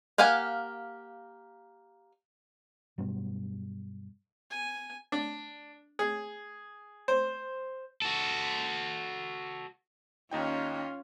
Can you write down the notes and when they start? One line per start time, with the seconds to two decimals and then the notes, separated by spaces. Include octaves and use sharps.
0.18 A#3 G4 F5 F#5 G#5
2.98 G2 B2 F#3 G3
4.51 G#5
5.12 D4
5.99 G#4
7.08 C5
8.02 F#4 A4
10.31 D#2 C#4 D#4 F4 G5